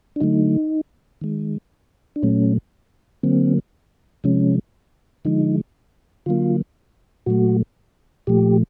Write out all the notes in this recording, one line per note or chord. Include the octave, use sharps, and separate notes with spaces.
D4
D3 F#3 A3 D#4
D#3 G#3
D4
A#2 F#3 A3 C#4
D3 F#3 A#3 C4
C3 F3 G#3 C#4
D3 F3 G#3 D#4
D3 F#3 A#3 F4
A#2 F#3 A3 F#4
A#2 F3 A3 G4